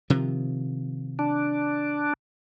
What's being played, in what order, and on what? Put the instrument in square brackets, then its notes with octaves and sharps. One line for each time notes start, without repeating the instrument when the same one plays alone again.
[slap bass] C3 D#3 F3
[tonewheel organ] D4